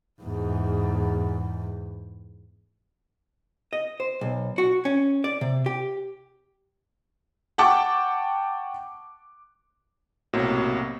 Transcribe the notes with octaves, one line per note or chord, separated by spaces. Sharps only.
E2 G#2
D#5
C5
B1
F#4
C#4
D5
C3
G4
F#5 G5 A5 C#6 D6
B1 A2 C3 F#3 A#3